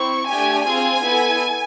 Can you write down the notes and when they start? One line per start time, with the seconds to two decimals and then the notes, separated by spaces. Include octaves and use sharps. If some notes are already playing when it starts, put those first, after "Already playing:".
Already playing: C4 E4 C#6
0.27 A3 D4 G4 G#5
0.65 C4 F4 G#4 G#5
1.02 B3 E4 A4